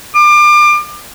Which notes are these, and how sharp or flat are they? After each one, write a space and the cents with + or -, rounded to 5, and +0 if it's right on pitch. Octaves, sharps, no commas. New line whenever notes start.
D6 +30